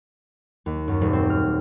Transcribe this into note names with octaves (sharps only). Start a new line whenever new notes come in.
D#2
F#2
D#1
C4
F6